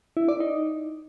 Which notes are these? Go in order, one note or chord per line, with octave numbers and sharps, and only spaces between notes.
E4
D5
D#4